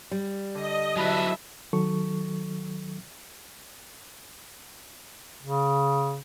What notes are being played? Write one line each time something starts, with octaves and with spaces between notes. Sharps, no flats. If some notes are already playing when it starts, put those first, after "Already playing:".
G3
D3 D#5
F#3 E4 E5 A5 B5 F#6
D#3 F#3 A4 C#6
C#3